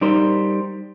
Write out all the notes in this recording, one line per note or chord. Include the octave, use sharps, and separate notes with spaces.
G3 D#4 A#4 C5